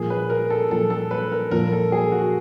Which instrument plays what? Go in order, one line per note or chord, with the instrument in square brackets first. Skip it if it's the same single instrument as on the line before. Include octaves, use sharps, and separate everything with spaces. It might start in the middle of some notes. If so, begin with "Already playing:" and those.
Already playing: [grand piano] A#2 F3 A#3 [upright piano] G#4
[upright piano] B4
A#4
A4
[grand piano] A#2 F3 A#3 [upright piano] A4
[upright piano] A4
B4
A#4
[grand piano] A#2 F3 A#3 [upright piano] A#4
[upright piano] A4
G#4
F#4